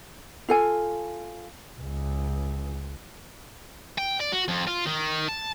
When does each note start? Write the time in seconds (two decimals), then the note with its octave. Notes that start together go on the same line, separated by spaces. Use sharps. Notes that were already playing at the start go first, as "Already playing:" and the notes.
0.49 F4 A4 G#5
1.80 C#2
3.98 G5
4.20 D5
4.32 F#4
4.48 F2
4.68 F4
4.87 D#3
5.29 A5